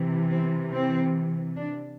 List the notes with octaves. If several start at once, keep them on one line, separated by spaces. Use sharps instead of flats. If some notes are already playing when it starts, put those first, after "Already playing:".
Already playing: C3 E3
C4
C4
D4